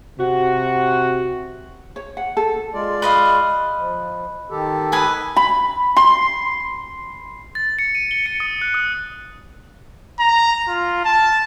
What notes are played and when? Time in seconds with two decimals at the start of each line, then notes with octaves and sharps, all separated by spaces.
0.19 C3 F#4
1.96 C#5
2.17 F#5
2.37 A4
2.74 G#3 F4 D5
3.02 B4 D#5 F5
3.79 F3
4.51 D#3 G4 A4
4.92 B4 G#5 D#6
5.36 B5
5.97 C6
7.55 A6
7.79 C#7
7.95 D#7
8.11 G7
8.26 C#7
8.40 D#6
8.61 F#6
8.74 D#6
10.19 A#5
10.68 F4
11.05 A5